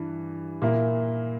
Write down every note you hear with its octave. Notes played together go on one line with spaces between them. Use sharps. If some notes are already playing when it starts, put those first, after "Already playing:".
Already playing: G2 E3
A#2 A#3 E4